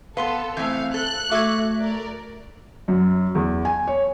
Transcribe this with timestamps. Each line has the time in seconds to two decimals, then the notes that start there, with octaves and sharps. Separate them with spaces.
0.17 B3 A4 B4 F5 C6
0.57 E3 A3 C4 F5 G6
0.94 A4 F#6
1.31 A3 F#4 A4 E5 D6 G#6
1.79 A#4 D5
2.88 F#2
3.35 E2
3.65 G#5
3.88 C#5